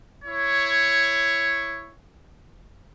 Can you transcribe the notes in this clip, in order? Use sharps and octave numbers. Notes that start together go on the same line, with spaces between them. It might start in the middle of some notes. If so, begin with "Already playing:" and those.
E4 C#5